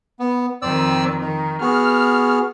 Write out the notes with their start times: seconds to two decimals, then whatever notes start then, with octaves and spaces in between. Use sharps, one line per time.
0.19 B3
0.62 F2 D#3 C4 D5 E6
1.21 D#3 D#4
1.61 B3 F#4 G#4 F6